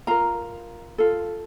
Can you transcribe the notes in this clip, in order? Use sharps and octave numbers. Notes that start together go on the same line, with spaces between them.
F4 A#4 A#5
F4 A4